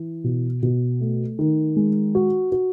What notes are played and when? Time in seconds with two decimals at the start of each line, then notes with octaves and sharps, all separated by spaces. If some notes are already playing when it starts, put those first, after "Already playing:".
Already playing: E3
0.24 B2
0.63 B2
1.01 A3
1.39 D#3
1.76 G#3
2.15 F#4
2.52 F#4